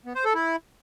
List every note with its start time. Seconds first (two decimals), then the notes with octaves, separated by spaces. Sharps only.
0.06 B3
0.15 C5
0.25 A4
0.34 E4